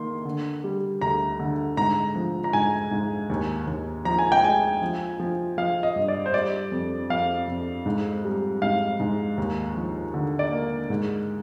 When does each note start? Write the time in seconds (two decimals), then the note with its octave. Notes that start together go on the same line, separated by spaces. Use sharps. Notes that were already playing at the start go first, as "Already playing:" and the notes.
Already playing: D#3 A#3 C6
0.25 D3
0.64 G3
1.01 D2 A#5
1.39 D3
1.77 G#2 A#5
2.15 F3
2.44 A#5
2.53 G#2 G#5
2.91 G#2
3.30 D#2
3.67 D#2
4.05 F3 A#5
4.19 G#5
4.32 G5
4.44 G#3 G#5
4.82 F3
5.20 F3
5.58 F3 F5
5.83 D#5
5.96 G2
6.08 D5
6.26 C5
6.34 G3 D5
6.72 F2
7.10 F2 F5
7.48 F2
7.86 G#2
8.24 G3
8.62 G#2 F5
9.00 G#2
9.38 D#2
9.75 F3
10.14 D3
10.39 D5
10.52 A#3
10.90 G#2